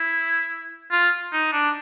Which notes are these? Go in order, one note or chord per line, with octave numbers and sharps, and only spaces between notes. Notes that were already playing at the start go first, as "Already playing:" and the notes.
Already playing: E4
F4
D#4
D4